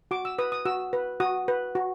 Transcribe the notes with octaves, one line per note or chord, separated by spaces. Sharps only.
F#4 D6
E6
B4 D#6
D#6
F#4 E6
B4
F#4 D#6
B4
F#4